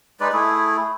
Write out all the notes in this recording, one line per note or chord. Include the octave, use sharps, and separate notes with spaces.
G#3 D#4 B4 D5
A3 E4 G#4